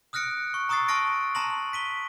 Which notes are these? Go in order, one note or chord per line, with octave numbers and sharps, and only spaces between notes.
D#6 F6 F#6 A#6 C#7 D7
C#6
A#5 C#6 D#6 E6 A6 C7
A5 C6 C#6 F6 A#6 D7
A5 A#5 C6 A#6 F#7
B6 D#7 G7